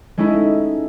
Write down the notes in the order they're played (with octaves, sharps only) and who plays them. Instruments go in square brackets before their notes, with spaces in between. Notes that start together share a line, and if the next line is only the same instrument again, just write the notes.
[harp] G#3 A3 C#4 D#4 E4